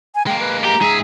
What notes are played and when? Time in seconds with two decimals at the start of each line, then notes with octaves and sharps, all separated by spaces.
0.15 G#5
0.27 G#3 A#3 G5
0.40 B4
0.64 G4 A#5
0.81 G#2 G#4 E5